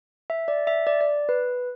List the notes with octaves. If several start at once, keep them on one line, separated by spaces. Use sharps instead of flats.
E5
D5
E5
D5
D5
B4